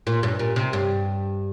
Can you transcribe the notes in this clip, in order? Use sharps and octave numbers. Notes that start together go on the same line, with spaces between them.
A#2
G2
A#2
C3
G2